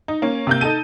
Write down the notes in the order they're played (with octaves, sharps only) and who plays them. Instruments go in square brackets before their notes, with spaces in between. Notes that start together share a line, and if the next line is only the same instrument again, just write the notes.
[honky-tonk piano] D#4
A#3 C#4
C3 A#3 G6
D#4 A4 A5 D#7